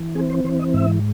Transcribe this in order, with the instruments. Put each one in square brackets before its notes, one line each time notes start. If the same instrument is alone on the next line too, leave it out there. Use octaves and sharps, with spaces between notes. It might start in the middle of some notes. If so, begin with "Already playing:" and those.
Already playing: [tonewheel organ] E3
C4 G#4
C5
E3 C5
D#5
G#2 E5